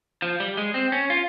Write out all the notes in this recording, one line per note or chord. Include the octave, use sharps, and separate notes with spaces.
F3
G3
G#3
C4
C#4
F4